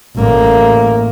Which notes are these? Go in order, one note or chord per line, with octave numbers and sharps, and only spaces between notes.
A1 A#3